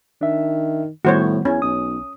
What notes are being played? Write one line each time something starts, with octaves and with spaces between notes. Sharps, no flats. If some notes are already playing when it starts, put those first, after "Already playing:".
D#3 D4 E5
A2 D#3 G3 B3 F#4 C5 C#5
E2 C#4
B1 D#6